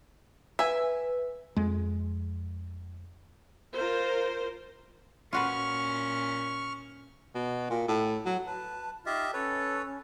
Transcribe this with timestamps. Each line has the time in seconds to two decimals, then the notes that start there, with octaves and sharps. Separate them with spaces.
0.59 B4 E5 G#5
1.57 F2 G#3
3.73 F4 A#4 C5
5.33 A#2 C#4 F4 F#4 B4 C#6 F6
7.35 B2
7.70 A#2
7.88 A2
8.26 F#3
8.47 B4 A5
9.06 D#4 F4 G4 D#5 E5
9.33 C#4 A4 B4 C#5